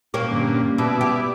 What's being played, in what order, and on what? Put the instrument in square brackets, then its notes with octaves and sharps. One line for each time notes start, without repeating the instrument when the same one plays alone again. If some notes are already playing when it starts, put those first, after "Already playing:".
[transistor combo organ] A#2 [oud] A#3 C#4 G4
[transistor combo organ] G2 A#2 D3
[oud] B2 [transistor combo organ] B3 E4 D5
[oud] G4